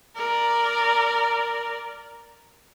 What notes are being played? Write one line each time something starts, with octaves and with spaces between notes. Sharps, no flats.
A#4 D5